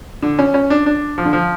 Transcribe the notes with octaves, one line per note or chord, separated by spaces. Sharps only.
D3
C#4
C#4
D4
D4
F3
D3
F3